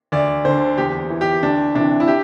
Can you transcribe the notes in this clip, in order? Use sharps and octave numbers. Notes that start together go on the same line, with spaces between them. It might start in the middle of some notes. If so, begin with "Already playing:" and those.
D2 D5
D3 C5
E2 G4
E3
G4
D2 D4
C3 E3 D4
E4
G4